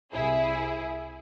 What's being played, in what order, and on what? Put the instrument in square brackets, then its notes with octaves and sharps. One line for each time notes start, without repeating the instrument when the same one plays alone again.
[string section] C2 E4 G#4